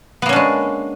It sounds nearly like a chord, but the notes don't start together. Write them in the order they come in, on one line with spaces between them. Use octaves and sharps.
B3 A#3 C#4 D4 G#3